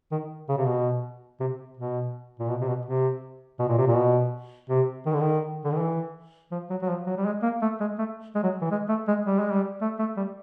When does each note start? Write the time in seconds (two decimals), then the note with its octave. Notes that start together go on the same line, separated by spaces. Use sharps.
0.11 D#3
0.49 C#3
0.57 C3
0.66 B2
1.40 C3
1.77 B2
2.39 A#2
2.49 B2
2.61 C3
2.68 B2
2.86 C3
3.59 B2
3.69 A#2
3.78 C3
3.87 A#2
3.95 B2
4.69 C3
5.06 D#3
5.13 D3
5.21 D#3
5.65 D3
5.72 D#3
5.78 E3
6.52 F3
6.70 F#3
6.82 F#3
6.89 F3
7.06 F#3
7.17 G3
7.25 G#3
7.43 A#3
7.62 A3
7.80 G#3
7.98 A3
8.35 G#3
8.43 F#3
8.61 E3
8.71 G#3
8.89 A3
9.08 G#3
9.25 G3
9.39 G#3
9.52 G3
9.81 A3
9.99 A3
10.17 G3